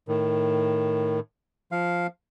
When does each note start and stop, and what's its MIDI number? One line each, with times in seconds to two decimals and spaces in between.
0.08 1.20 45
0.08 1.20 51
1.72 2.07 53
1.72 2.07 77